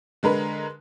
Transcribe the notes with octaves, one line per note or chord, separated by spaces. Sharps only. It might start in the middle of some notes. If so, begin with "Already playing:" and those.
D3 G#3 A#4 B4